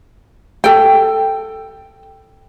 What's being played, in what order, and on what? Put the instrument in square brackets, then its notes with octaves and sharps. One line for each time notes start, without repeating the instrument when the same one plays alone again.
[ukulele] A4 G5